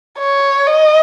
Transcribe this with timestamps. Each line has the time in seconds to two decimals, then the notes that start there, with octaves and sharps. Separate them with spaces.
0.19 C#5
0.67 D#5